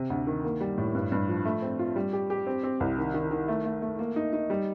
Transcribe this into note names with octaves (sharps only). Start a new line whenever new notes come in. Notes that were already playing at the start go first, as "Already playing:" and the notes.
Already playing: C3
D2
D#3
A#3
G3
A2
G2
G2
F3
A3
C4
F4
G3
G4
G4
C4
C4
C2
D#3
D#3
D#3
A3
A3
A3
A#3
D#4
D#4
G3